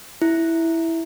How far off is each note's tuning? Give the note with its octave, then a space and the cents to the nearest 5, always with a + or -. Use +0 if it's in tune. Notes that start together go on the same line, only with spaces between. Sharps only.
E4 -5